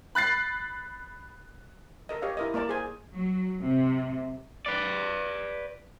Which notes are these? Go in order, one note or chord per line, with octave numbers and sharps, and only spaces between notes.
B5 F#6 A6 C7
A4 A#4 D#5
G4 C#5 D#5 F5
E4 A#4 D#5
A#3 A#4 D5 A5
G#4 C5 G#5
F#3
C3
B4 D5